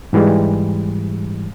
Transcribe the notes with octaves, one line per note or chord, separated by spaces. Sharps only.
G#2 E3 G3 G#3